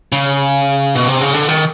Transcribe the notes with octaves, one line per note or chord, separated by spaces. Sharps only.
C#3
B2
C3
C#3
D3
D#3